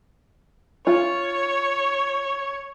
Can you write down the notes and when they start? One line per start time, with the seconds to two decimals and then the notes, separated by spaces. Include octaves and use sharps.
0.87 F4 C#5